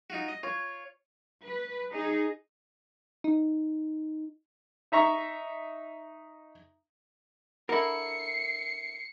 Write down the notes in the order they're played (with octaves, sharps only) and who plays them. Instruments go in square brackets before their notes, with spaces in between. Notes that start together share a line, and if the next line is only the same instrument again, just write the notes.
[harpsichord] D#4 F4 F#4
D#5
[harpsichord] F4 [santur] C#5
[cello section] B4
D#4 G#4
[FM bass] D#4
[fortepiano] D#4 E5 A#5 C#6
[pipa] D3 E4 [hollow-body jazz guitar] A#4 [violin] C7 C#7